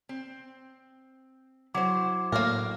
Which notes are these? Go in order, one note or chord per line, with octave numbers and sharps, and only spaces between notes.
C4
F#3 E4 C5 D6
A2 A#3 D4 A#4